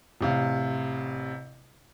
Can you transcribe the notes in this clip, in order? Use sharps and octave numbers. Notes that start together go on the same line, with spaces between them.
A1 C3 F5